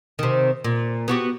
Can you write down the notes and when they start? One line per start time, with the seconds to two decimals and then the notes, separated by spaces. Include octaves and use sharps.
0.19 C3 D#3
0.64 A#2
1.08 B3 F#4 G4